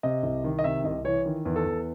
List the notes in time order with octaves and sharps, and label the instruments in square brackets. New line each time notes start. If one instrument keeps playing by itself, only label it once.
[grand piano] C3 D#5
C2
D#3
D#5
C3 E5
C2 D#5
E3 C#5
D#3
E2
A4
E2